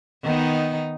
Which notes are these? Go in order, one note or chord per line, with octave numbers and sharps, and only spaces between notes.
D#3 B3 D#4